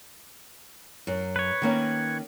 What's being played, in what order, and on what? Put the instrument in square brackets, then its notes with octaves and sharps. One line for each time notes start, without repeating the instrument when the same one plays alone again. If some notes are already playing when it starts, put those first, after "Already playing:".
[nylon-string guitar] F#2
[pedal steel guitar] B4 C#5
[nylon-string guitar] D#3 A#3 C#4